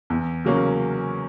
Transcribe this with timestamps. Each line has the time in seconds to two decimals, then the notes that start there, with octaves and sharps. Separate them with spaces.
0.10 E2
0.45 C#3 F#3 A#3 C#4